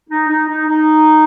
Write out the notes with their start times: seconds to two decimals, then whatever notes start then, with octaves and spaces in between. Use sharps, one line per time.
0.09 D#4
0.29 D#4
0.47 D#4
0.68 D#4